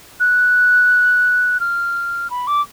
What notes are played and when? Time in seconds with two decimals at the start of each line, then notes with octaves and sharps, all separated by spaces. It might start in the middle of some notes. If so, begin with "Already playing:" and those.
0.20 F#6
1.60 F6
2.30 B5
2.47 D6